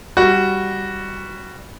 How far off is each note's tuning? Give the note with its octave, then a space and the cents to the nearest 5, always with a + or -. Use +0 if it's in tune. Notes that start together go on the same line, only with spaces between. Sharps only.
G3 +0 F#4 +0